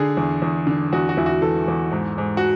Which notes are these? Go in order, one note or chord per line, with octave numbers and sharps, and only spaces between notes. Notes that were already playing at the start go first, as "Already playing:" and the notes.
Already playing: D3 G#4
E2
E2
D3
E2 F#4
F#4
E2 E4
F#4
E3 A4
E2
G#2
G#2
F#4